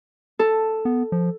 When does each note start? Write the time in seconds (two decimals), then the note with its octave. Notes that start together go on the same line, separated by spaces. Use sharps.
0.39 A4
0.85 B3
1.12 F3